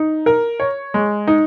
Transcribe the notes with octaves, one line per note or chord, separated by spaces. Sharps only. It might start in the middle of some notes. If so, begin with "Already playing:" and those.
Already playing: D#4
A#4
C#5
G#3
D#4